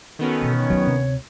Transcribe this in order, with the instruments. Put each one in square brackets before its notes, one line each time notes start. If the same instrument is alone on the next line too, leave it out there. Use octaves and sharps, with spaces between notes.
[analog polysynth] D#3 B3 C#4 [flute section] F#4 A4
[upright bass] B2 E3
[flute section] C#5
[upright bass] D2 D#4 [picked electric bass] F#3
[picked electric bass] C3